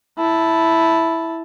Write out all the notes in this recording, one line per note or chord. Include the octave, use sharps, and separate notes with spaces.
E4 A5